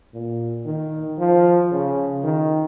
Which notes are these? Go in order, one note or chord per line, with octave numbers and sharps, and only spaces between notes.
A#2
D#3
F3
C#3
D#3